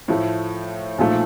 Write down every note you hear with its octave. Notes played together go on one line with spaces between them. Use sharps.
A2 F3 A3
B1 A#2 F3 A3